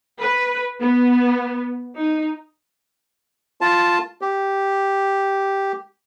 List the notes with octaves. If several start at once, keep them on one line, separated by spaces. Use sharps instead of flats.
B4
B3
D#4
F4 A5
G4